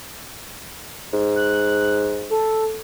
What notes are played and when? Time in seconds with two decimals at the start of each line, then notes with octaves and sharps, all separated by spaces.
1.13 G#2
1.36 F#6
2.30 A4